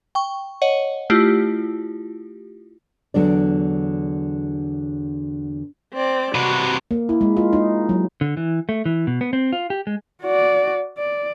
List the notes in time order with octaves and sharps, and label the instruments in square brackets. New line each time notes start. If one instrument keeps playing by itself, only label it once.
[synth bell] G5 C#6
C#5 D#5 F#5
A3 E4 F4 G4
[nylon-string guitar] E2 D3 F#3 D4 D5
[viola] C4 D5
[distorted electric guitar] C3 B4 [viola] F#4
[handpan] A#3
E4
G#3
F4
D#4
F#3
[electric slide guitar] D3
E3
A3
E3
B2
B3
C4
F4
G4
G#3
[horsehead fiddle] F#4 D5
D5